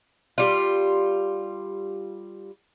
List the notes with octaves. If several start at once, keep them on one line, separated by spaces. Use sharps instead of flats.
G3 F4